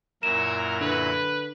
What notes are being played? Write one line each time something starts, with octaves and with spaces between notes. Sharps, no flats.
F#2 A#2 E4 A#4 E7
D3 B4